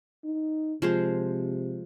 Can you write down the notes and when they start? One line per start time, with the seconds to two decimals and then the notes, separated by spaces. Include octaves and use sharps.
0.24 D#4
0.82 C3 F3 G#3 C5